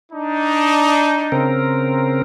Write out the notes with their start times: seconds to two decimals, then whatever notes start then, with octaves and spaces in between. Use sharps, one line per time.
0.12 D4 D#4
1.32 C#3 C4 A#4